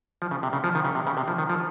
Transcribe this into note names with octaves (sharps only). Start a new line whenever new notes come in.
F3
C#3
C3
C#3
F3
D#3
C#3
C3
C#3
C3
F3
D#3
F3